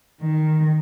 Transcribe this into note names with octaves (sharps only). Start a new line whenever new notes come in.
D#3